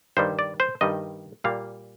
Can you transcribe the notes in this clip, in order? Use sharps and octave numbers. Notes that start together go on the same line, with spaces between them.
G2 D#3 G3 C5
D5
C5
G2 D#3 G3 D#5
A#2 G3 A#3 F5